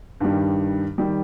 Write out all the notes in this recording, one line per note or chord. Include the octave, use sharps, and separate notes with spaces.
G2 D#3 G3
D#3 G3